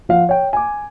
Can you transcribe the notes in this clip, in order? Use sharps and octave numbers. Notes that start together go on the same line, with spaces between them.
F3 F5 F#5
C#5 G5
G#5 D6